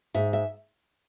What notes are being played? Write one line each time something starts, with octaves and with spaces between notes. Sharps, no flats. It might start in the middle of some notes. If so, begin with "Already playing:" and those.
G#2 E5
E5